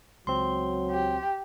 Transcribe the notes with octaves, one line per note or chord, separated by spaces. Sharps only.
C#2 F#3 C4 C6
G4